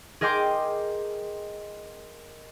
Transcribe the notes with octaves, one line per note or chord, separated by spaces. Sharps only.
G#4 A#4 D#5 G5 C6 D6